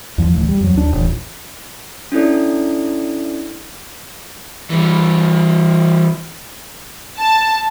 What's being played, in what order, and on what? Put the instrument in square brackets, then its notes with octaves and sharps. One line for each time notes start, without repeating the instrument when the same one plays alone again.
[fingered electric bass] E2 F3
A1 D2
G3
F2 F#3
D#2 D4
D#1 A1
[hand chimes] C#4 D4 E4 A4 D5
[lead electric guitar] E3 G3
[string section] A5